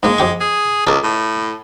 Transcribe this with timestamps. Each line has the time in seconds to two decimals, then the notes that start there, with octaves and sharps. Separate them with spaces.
0.03 G#2 G#3 A#3
0.18 F2 G4 C#6
0.41 G#4
0.87 C#2 A4 A#4
1.03 A2